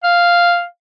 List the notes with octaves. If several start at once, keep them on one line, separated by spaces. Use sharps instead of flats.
F5